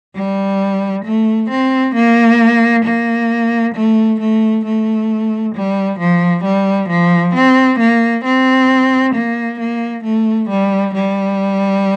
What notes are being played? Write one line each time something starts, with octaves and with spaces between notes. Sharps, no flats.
G3
A3
C4
A#3
A#3
A3
A3
A3
G3
F3
G3
F3
C4
A#3
C4
A#3
A#3
A3
G3
G3